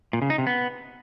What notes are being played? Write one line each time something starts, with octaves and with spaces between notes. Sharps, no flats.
A#2
C#3
D#4
C3
B3